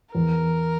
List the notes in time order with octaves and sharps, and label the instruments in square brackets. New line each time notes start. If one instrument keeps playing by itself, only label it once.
[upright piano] E2 [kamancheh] A#4